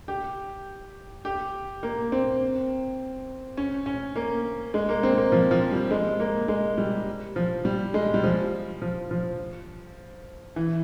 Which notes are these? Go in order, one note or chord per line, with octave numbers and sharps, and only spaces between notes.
G4
G4
A#3
C4
C#4
C#4
A#3
G#3
A#3
C4
A#3
F3
F3
G3
G#3
A#3
G#3
G3
F3
G3
G#3
G3
F3
F3
F3
E3